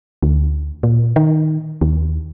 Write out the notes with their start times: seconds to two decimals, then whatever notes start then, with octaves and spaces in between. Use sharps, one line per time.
0.23 D2
0.83 A#2
1.16 D#3
1.81 D#2